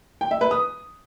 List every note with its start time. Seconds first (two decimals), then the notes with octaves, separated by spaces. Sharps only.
0.21 G5
0.31 E5
0.41 B4
0.51 D#6